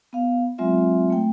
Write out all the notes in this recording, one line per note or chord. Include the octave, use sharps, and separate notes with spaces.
B3 F5
F#3 G#3 C4 F4 E5
A3 G5